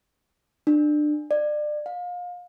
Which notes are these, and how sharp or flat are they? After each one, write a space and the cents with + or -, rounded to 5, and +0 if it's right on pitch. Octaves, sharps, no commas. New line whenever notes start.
D4 +25
D5 +30
F5 +30